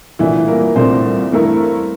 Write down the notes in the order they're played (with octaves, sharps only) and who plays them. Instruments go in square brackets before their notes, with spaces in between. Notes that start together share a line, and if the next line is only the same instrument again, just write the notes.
[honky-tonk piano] C2 A#2 A3 D4 [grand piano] E3 E4
[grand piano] A#3 A#4
[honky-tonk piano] C2 A#2 A3 D4 [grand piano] C4 C5
[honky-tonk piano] G2 E3 A3 E4 A#4